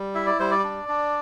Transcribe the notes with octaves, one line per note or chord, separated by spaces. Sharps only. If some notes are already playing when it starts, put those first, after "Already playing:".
Already playing: G3
E4 E5
D5
G3 C5
D5
D4
D4